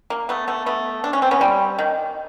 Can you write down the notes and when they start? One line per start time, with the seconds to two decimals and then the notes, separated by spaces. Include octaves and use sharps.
0.10 A#3
0.29 A3 B3
0.48 A3 B3
0.66 A3 B3
1.04 D4
1.13 C#4
1.22 C4
1.31 B3 C#4
1.41 G3
1.79 D#3